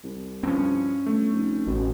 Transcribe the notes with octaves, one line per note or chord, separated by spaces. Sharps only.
C2
G2 F3 C4 C#4
G1 A3
F1
A1 B2